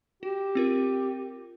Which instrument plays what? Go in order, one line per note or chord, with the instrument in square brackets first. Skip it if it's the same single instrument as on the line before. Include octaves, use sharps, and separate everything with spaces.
[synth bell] F#4 [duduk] G4
[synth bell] C4 F4 A#4